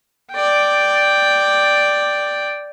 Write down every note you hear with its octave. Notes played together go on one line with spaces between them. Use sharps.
D5 G5